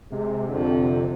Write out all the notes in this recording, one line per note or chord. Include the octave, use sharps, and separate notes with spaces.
C3 G#3
F2 D3